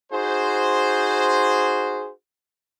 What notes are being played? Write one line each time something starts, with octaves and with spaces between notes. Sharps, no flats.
D#4 F#4 G#4 C5